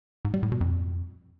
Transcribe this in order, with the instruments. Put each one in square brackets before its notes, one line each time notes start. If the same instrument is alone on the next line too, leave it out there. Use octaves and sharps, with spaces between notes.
[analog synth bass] G#2
G3
A2
B2
F2